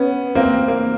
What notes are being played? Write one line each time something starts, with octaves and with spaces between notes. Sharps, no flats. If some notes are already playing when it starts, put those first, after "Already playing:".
Already playing: B3 C#4
A#3 C4
A#3